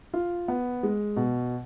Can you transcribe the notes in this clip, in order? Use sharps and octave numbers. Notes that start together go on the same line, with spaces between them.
F4
B3
G#3
B2